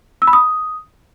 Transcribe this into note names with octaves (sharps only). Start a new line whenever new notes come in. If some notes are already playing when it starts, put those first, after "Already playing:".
E6
B5
D#6